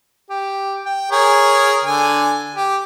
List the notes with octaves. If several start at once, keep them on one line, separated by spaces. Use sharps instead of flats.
G4
G5
G#4 A#4 C#5
D3 G#5
G4